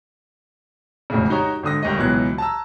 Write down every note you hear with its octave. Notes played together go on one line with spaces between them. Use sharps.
E1 F2 A2 C#3
D#4 F#4 G4 C#5 A#5
G#1 D3 D#6 A#6
G1 D#2 D#5
C#2 B2 E3 F#3 F#6 G#6
A5 A#5 E6